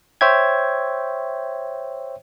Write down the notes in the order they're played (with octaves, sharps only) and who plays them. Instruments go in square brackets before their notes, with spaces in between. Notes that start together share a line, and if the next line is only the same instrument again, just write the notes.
[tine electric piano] C5 C#5 E5 G5 G#6